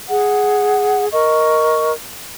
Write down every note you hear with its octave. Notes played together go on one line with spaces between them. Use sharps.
G#4 F#5
A#4 D#5 C#6